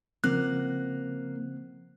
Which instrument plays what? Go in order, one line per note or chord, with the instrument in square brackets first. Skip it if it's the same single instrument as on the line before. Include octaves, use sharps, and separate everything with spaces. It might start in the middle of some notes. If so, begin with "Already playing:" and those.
[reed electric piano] C#3 F3 [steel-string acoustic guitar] A#3 [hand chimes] C4 F#6